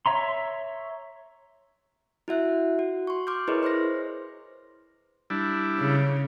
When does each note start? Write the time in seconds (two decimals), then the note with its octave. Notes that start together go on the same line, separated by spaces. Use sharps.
0.06 C#5 E5 A#5 C6
2.28 E4 F#4 E5 F#6
2.79 F#4
3.07 C6 C#6
3.27 C6 D6 F6 G6
3.48 E4 G#4 A#4 B4 C#5 D#5
3.63 C5 C6 F6 A#6
5.30 G3 D4 E4
5.79 C#3